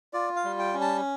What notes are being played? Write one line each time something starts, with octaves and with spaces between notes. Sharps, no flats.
F4 D5
F5
G3
G5
C#4
A5